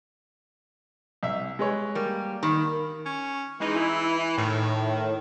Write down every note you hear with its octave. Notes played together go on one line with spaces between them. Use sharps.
C2 E5
G#3 B4 C#5
G3 A#3
D#3 B5
C#4
E3 G#3 D#4
E4
A2 D#3